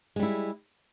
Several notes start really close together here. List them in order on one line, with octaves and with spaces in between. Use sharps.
G#3 G3 E4